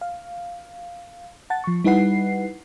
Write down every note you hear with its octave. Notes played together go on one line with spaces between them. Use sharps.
F5
F#5 A5 A6
F3 C#6
G3 D#4 E4 B4 F#5 C7